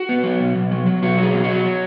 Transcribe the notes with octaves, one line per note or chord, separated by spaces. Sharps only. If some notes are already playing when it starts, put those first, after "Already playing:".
Already playing: F#4
B3
F#3
B2
B2
F#3
F#3
B2 F#4
F#3 G#4
B2
F#3 F#4
F#3